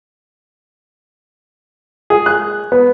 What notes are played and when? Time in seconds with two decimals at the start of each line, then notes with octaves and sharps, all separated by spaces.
2.10 G#4
2.26 F#6
2.72 B3